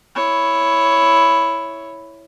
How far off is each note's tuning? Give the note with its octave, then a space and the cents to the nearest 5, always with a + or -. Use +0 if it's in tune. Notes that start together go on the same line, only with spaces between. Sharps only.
E4 +0 C#5 +0